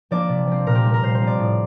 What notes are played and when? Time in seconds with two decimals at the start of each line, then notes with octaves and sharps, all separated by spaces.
0.11 F3 A#3 D4 D5
0.29 C3
0.47 F3 C4
0.66 A#2 A#4
0.75 G4
0.85 G3 D4
0.94 A#4
1.02 A#2 C5
1.15 C5
1.21 F3 C4
1.27 D5
1.39 A2